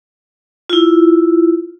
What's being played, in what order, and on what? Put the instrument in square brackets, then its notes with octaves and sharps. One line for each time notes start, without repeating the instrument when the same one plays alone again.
[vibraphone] E4 F4